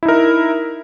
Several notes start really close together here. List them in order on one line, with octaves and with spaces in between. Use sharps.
E4 D#4 A#4